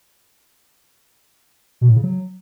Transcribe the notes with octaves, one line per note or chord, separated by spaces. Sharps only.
B2
A2
C#3
F#3